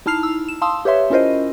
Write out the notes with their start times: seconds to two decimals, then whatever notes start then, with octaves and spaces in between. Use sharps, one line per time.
0.06 D#4 E4 A5 F6 C7 F7
0.23 E6
0.48 E7
0.62 F5 A5 C6 D#6 E6
0.85 G4 B4 C#5 E5 C6
1.10 C#4 E4 F4 A#4 C5 D#5